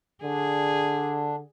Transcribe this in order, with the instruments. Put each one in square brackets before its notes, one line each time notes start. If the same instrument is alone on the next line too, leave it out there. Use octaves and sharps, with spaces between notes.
[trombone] D3 [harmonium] D4 [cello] G#4